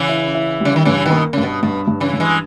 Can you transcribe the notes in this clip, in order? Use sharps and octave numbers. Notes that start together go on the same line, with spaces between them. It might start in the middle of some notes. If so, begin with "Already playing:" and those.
Already playing: C#3 E3
E4
E4
C#3 G3
D#3
G2 C#3 E3
B2 D#3
A#3
G2 C#3
B2
G2 B2
G2
C#3 E3
G2
E3 G#3